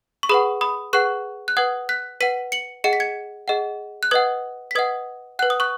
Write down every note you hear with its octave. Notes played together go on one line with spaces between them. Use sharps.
C#6
G#4 B4 F#5 B5 D#6
B5 D#6
G#4 B4 F#5 C#6 F#6
F#6
B4 F#5 D#6 G#6
F#6 B6
B4 F#5 B6 D#7
C#7 F#7
G#4 D#5 F#5 C#7
B6
G#6 C#7
G#4 D#5 F#5
F#6
B4 D#5 F#5 D#6 G#6
B6
B4 D#5 F#5 D#6 G#6
B4 F#5 F#6
D#6
C#6 F#6